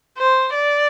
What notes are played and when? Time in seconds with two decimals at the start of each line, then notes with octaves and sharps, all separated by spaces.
0.18 C5
0.55 D5